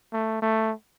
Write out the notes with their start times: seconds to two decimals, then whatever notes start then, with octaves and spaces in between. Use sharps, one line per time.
0.13 A3
0.42 A3